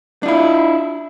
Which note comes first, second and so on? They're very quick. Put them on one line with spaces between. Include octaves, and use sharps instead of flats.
D4 F4 E4